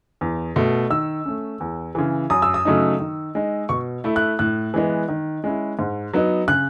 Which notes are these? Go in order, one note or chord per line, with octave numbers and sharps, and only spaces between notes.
E2
B2 A3
D#3 E6
A3 C#4
E2
C#3 E3
F#2 D#6
E6
D#6
C#3 F#3 A3 D#4
D#3
G#3 D#4
B2 C#6
A3 E4
F#6
A2 F#6
E3 G#3 B3
D#3
G#3 C#4 E4
G#2
F#3 B3 D#4
C#3 F#6